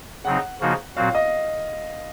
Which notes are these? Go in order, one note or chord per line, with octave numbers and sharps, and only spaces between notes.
C#3 F#3 C4 D#4 F#5
C#3 F3 A#3 D#4 F#4
A#2 F#3 C4 F#4 F5
D#5